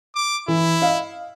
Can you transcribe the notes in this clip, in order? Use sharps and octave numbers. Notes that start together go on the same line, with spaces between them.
D6
E3 E4
D#5 F5